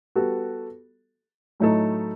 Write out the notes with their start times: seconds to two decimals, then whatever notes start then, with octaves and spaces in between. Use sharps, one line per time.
0.15 G3 B3 F#4 A4
1.60 A2 F#3 A3 D#4 A4